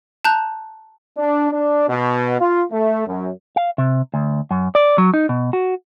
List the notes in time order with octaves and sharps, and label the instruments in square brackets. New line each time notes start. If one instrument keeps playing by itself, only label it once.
[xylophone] A5 A#5 F#6 G6
[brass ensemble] D4
D4
B2
F4
A3
F#2
[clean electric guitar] F5
C3
D2
F#2
D5
F#3
D#4
B2
F#4